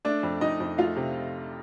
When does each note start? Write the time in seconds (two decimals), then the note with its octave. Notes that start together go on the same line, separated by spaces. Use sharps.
0.05 A3 D4 D5
0.23 F2
0.41 F2 D#4 D#5
0.60 F2
0.78 A3 F4 F5
0.96 C3